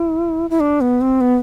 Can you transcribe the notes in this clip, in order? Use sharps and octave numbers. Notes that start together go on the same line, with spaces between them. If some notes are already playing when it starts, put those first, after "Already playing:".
Already playing: E4
E4
D4
B3
C4
B3